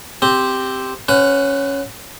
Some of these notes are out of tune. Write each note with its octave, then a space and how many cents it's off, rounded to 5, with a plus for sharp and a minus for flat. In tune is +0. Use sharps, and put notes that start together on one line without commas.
C4 +0 G4 +0
C#4 +0 B4 +40 F#5 +0